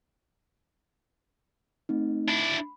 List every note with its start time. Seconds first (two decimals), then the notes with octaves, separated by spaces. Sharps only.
1.89 A3 C4 D#4
2.28 D4 E4 B5